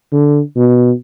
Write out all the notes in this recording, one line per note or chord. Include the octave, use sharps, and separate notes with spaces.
D3
B2